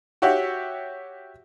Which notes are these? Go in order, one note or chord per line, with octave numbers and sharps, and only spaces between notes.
F#4 G4 C#5 E5 F#5